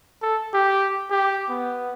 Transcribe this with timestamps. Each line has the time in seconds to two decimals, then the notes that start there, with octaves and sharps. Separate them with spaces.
0.22 A4
0.54 G4
1.11 G4
1.49 B3